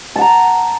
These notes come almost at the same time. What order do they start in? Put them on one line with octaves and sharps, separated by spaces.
A5 F#5 A#5